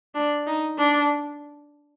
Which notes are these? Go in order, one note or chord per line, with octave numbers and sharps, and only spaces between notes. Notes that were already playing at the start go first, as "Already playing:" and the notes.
D4
D#4
D4